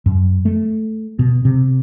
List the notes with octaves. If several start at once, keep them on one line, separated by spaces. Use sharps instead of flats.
F#2
A3
B2
C3